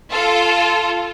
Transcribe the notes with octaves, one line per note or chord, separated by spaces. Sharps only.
F4 A4